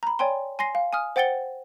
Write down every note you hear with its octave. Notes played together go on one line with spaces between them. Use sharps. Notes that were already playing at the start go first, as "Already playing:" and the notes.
A#5 B5
C#5 D5 G5 G#5 C6
G#5 C6 A#6 C7
F5
G#5 D#6 F6
C5 F#5 G5 A6 C#7 G7